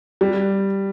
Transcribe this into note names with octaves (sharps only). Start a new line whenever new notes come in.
G3